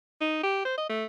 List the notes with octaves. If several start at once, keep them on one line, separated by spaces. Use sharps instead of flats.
D#4
G4
C5
D#5
A3